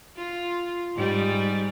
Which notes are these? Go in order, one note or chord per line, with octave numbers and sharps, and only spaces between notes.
F4
G#2 G3